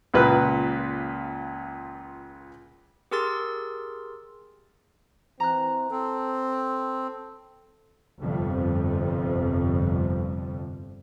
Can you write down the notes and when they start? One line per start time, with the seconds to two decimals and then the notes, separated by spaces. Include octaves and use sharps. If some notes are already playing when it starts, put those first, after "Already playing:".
0.14 C#2 A#2 B4 F#6
3.11 G4 G#4 A#4 C6 E6 A6
5.40 E3 C4 A#5 F#6
5.91 C4 A4
8.21 G1 F2 C3 G3